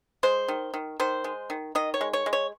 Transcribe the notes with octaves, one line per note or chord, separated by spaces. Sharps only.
G#3 C5
D#3
D#3
D#3 C5
G#3
D#3
D#3 D#5
C#5
G#3
C#5
G#3
C#5